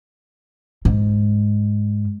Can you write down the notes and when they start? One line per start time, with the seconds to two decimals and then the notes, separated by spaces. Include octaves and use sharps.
0.85 G#2